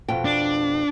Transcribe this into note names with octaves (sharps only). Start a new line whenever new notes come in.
F2 B2 G5
D4